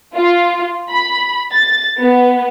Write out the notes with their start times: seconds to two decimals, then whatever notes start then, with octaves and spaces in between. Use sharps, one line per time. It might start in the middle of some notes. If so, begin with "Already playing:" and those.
0.15 F4
0.90 B5
1.53 A6
2.00 B3